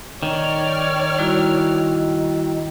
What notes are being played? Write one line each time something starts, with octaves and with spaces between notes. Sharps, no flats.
D#3 C#5 D5 F6
G3 E4 F#4